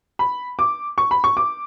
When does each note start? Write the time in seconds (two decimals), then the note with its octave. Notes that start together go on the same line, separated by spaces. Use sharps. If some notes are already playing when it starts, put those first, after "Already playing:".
0.19 B5
0.59 D6
0.98 C#6
1.11 B5
1.24 C#6
1.37 D6